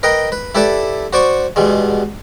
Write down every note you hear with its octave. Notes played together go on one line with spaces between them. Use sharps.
A#4 B4 D#5 G5 A#5
B4
E4 G4 A4 B4 D5 E5
F#4 C5 D5 C#6
E2 B2 G3 G#3